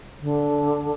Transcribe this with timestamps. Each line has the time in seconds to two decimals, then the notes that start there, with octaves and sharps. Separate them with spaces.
0.21 D3